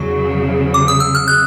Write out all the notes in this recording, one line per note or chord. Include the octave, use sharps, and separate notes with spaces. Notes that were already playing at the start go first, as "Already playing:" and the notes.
Already playing: E2 C#3 F#3 C#6
D6
D#6
E6
F6
F#6